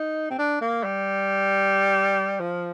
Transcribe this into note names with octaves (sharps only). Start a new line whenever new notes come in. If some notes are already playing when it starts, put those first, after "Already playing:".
Already playing: D#4
C4
D4
A#3
G3
F3